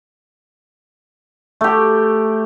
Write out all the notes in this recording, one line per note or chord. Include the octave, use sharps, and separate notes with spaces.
A3 G4